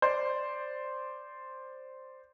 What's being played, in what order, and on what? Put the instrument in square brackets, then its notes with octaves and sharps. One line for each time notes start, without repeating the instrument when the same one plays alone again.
[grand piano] C5 D5